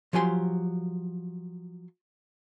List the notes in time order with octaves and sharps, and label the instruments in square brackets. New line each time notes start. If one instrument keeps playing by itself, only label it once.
[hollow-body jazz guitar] F3 F#3 G4 G#5 C6